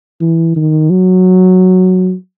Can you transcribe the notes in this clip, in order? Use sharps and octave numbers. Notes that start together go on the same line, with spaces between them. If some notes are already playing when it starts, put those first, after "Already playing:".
E3
D#3
F#3